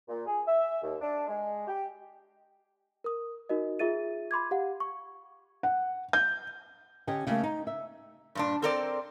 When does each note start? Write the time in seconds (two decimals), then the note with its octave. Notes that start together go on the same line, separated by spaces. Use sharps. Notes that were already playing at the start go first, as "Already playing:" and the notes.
0.08 A#2
0.26 G#4
0.46 E5
0.82 D#2
1.01 D4
1.27 G#3
1.67 G4
3.04 A#4 D#6
3.49 D#4 F#4 A#4 D#5
3.79 F4 G#4 E5 A6 D#7
4.31 B5 C6 D6 G#6
4.51 G4 F5 F#5
4.80 C#6
5.63 F#5
6.13 G6
7.07 D3 C#4 G4 D#5
7.27 C#3 G3 A3 A#3
7.43 D#4
7.67 E5
8.35 G2 A#2 D4
8.62 C4 A4 A#4 C5 D5